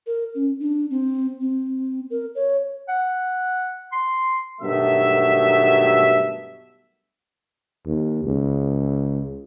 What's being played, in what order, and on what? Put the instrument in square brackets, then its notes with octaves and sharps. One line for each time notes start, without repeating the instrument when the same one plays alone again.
[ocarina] A#4
C#4
D4
C4
C4
A#4
C#5
[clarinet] F#5
C6
[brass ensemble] G2 B2 D#3 F#3 A3 E5
[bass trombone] D#2
C#2